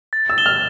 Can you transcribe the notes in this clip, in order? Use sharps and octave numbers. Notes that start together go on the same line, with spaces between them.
A6
E6
E7 G7
F6